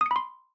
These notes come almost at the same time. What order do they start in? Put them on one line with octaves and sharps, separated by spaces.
D#6 C#7 B5 C6